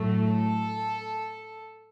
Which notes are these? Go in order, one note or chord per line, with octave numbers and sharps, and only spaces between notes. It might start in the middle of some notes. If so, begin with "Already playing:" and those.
Already playing: A2 F#3 A3
A4